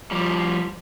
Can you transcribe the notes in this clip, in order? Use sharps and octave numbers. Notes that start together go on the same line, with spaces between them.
F3 G3